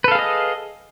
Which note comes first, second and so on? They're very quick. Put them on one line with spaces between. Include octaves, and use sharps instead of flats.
B4 A4 F5 G#4 D#5